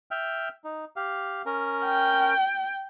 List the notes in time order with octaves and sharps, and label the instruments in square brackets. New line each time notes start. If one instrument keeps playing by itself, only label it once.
[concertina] E5 G5 F6
D#4
G4 F5
C#4 A#4
[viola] G5